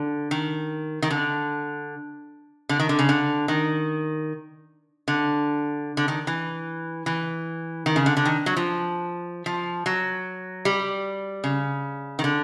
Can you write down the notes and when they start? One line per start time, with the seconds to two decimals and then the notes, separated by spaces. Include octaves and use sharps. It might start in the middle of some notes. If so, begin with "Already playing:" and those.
Already playing: D3
0.31 D#3
1.02 D#3
1.10 D3
2.69 D3
2.80 D#3
2.89 D3
2.99 C#3
3.09 D3
3.48 D#3
5.08 D3
5.97 D3
6.08 D#3
6.27 E3
7.06 E3
7.86 D#3
7.96 C#3
8.06 D3
8.17 D3
8.26 D#3
8.46 F#3
8.57 F3
9.46 F3
9.86 F#3
10.65 G3
11.44 C#3
12.19 D#3
12.24 D3